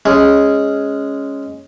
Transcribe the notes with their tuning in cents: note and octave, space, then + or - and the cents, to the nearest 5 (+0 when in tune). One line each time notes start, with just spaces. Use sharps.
G#3 +0 C#4 +0